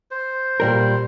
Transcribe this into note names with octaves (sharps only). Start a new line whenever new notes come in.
C5
A#2 G3 A#4